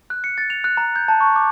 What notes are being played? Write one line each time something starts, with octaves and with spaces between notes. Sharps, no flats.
F#6
C#7
A6
F7
F#6
A#5
G6
A5
C#6
D6